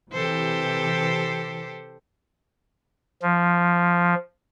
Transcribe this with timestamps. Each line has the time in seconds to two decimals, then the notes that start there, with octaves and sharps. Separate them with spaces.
0.13 C3 E3 G4 A4 C5
3.22 F3